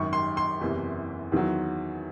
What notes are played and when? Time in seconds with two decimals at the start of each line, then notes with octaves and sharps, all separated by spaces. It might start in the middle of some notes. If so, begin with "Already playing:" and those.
Already playing: G#1 F#2 D#3 C#6
0.13 C6
0.37 C6
0.61 F#1 E2 C3 E3
1.32 E2 D#3 F#3